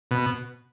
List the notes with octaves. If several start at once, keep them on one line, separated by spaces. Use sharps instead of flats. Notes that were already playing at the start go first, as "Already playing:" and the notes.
B2